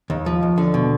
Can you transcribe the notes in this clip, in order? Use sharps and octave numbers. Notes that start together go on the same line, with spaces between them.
D#2
F3
D#2
D3
B2